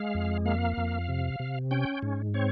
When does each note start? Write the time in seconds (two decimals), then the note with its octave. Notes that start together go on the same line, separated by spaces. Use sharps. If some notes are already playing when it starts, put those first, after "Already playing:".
Already playing: G#3 F5
0.15 F2
0.46 A#3 F5
0.77 F2
1.09 C3
1.40 C3
1.71 C#4 G5
2.02 G#2
2.34 C4 C#5